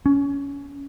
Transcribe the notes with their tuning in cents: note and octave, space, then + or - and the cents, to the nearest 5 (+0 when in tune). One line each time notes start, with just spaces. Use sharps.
C#4 +20